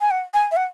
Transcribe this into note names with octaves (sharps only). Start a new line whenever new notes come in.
G#5
F#5
G#5
E5
F#5